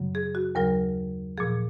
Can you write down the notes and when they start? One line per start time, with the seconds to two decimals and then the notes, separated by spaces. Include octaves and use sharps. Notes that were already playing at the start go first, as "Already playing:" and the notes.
Already playing: F#2 C#3 F#3
0.15 G#4
0.35 F#4
0.55 D#2 C#3 F#3 A#4
1.38 A#2 F3 G#4